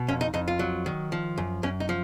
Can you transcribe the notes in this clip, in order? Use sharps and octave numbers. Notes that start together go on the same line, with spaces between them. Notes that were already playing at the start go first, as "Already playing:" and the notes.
Already playing: B2
F2 C#4
D#4
F2 D#4
F4
F#3
D#3
F3
F#2
F#2 C#4
D#4
F3